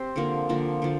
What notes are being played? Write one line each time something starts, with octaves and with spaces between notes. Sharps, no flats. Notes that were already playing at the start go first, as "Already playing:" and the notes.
Already playing: C4 G4 C5
D3 F3 A#3
D3 F3 A#3
D3 F3